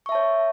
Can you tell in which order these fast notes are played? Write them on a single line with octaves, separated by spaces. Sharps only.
C#6 E5 A5 C#5